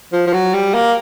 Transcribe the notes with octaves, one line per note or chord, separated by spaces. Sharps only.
F3
F3
F#3
G3
A#3